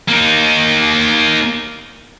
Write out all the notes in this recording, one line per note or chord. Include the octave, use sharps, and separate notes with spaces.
A#3 D#4